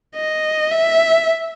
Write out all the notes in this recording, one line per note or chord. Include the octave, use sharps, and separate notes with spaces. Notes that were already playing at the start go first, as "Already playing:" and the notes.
D#5
E5